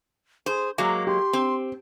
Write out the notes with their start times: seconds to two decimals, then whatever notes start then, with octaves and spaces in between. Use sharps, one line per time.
0.46 G#4 C5
0.78 F#3 G#3 A#3 D6
1.07 G4 C6
1.33 C4